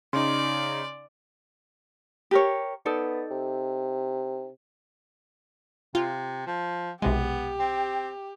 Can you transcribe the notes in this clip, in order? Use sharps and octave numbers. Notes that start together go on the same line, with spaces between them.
C#3 D#4 D5 C6
G4 A#4 C#5
B3 D#4 A4 D5
C3
C3 F4
F3
B1 C3 G#3 B3 G4
C4